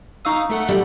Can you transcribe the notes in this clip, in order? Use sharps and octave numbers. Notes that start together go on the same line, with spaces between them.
D#4 F5 A#5 C#6 D#6 E6
A3 A4 F#5
G3